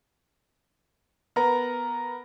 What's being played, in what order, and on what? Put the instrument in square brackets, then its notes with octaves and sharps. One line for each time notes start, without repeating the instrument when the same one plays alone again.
[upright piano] B3 [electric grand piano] A#4 A#5